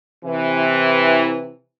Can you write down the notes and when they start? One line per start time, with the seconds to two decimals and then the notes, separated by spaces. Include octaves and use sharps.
0.24 C3 E3